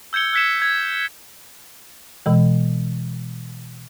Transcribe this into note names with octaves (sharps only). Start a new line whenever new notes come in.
E6 G6 G#6 C#7 G7
E6 F#6 G#6 B6 C#7 E7
G#6
B2 E3 G#3